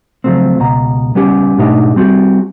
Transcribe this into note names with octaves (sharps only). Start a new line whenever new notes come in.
C#3 F3 F#3 A3 C4
C#2 B2 A#5
C#2 G3 B3 C#4 G4
G#2 B2 A3 D4 D#4 G4
G3 C4 F#4 G4